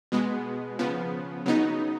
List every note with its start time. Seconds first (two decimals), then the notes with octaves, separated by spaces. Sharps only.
0.12 B2 G#3 B3
0.79 C#3 F3 B3
1.46 C#3 F#3 B3 D#4